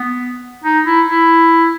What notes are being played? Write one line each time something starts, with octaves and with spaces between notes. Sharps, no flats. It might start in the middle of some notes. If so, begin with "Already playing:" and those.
Already playing: B3
D#4
E4
E4